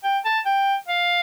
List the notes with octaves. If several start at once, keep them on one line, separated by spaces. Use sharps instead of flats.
G5
A5
G5
F5